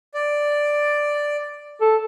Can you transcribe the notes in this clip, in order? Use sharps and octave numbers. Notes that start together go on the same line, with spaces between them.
D5
A4